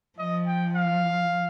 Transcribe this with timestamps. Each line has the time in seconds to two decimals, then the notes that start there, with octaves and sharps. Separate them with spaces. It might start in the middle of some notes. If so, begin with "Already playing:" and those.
0.18 F3 D#5
0.47 G5
0.75 F5